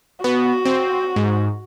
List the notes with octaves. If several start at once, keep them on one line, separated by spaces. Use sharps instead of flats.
B3 F#4
C4
G#2